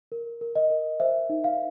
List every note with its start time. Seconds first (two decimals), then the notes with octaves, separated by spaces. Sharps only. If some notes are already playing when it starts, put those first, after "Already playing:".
0.12 A#4
0.41 A#4
0.56 D#5
0.70 A#4
1.00 C5 E5
1.30 D#4
1.44 F5